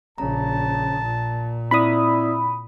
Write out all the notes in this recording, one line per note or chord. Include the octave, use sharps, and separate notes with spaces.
A#1 C#3 A5 A#5
A#2
C4 E4 D5 E5 B5 D#6